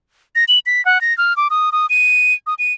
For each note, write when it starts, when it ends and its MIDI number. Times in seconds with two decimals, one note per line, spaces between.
0.35 0.45 94
0.48 0.59 102
0.66 0.84 95
0.85 1.01 78
1.01 1.16 94
1.18 1.36 89
1.37 1.48 86
1.50 1.70 87
1.72 1.86 87
1.90 2.34 99
2.47 2.54 87
2.59 2.73 99